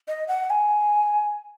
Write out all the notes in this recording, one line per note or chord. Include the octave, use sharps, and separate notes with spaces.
D#5
F#5
G#5